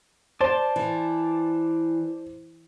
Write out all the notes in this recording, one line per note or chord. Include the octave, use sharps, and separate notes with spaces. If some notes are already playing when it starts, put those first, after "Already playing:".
C5 D5 A5 C6
E3